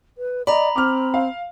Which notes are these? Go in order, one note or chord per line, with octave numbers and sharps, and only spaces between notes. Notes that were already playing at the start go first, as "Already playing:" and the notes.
B4
D5 D#5 A#5 B5
C4 D6 F6
F5